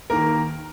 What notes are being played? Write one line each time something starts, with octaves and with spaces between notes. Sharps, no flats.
D#2 D#3 A#3 A#4